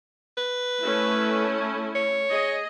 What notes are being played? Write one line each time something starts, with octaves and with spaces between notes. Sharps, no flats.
B4
A3 C#4 E4
C#5
G#4 D#5